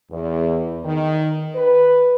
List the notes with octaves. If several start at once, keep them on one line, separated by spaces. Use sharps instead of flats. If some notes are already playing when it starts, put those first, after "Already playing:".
E2
D#3
B4